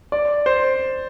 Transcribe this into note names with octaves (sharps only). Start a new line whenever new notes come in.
D5
C5